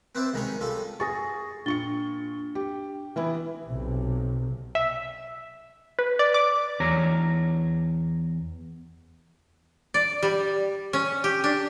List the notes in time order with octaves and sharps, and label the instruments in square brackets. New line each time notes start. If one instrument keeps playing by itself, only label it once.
[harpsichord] C4 B4 C5 D5 E5
C2 D#3 G#3 C#4 B5 C#6
G3 F4 A4
[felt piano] G#4 C#6 [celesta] A6 A#6
[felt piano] A#2 C#6 C#7 [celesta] D4 A6 G7
[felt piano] G4
E3 B3 E4
[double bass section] B1 C3
[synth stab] E5
B4
D5
D6
[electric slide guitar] E2 C#5 A#5
[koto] D5
G3
C#4
G4
D4